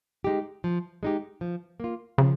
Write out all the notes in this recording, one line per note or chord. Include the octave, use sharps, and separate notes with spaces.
G#3 D#4 G4
F3
G#3 D#4 G4
F3
A#3 F4
C#3 F3